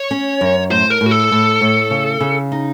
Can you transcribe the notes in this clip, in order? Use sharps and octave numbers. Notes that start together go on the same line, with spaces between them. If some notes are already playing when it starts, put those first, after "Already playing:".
Already playing: C#5
C#4
F#2
A2 C5
A#4
A2
F#4
A4
A2
A2
C#3
C#3
D#4